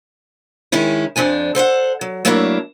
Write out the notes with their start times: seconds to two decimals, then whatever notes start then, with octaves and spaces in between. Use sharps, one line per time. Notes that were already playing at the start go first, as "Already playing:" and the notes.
0.72 D#3 G#3 C#4 E4
1.16 F2 F3 D4 G#5
1.55 A4 C5 E5 F#5
2.01 F#3
2.25 F#3 A3 A#3 D4 E4 C#5